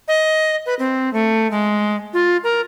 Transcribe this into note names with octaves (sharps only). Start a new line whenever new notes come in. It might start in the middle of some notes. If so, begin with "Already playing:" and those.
D#5
B4
C4
A3
G#3
F4
A#4